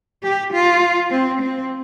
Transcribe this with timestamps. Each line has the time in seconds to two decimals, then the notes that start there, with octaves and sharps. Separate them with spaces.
0.23 G4
0.53 F4
1.11 C4
1.41 C4